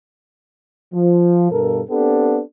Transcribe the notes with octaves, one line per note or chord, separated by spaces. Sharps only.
F3
G2 B2 A4 A#4
B3 C4 D4 G4 A4